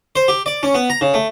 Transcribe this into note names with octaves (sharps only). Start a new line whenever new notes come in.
C5
G4
D5
C#4
B3
A#5
C#3
A3